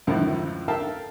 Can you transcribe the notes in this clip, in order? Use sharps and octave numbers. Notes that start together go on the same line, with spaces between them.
C#2 F#2 A2 D3 D#3 F3
A4 A#4 E5 F5 G5 A5